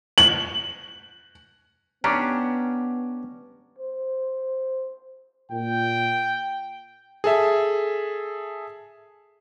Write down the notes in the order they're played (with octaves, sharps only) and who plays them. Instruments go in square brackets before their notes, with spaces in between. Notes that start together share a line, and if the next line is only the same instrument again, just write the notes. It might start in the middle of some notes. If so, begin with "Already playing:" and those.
[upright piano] F#7
[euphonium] B3 [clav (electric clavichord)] C#4 D4 G4 [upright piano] A#5 D6
[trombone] C5
[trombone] A#2 [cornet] G5
[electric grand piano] G#4 A4 E5